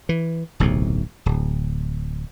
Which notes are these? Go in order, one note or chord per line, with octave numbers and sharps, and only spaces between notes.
E3
D1 B1 A2 C3
D1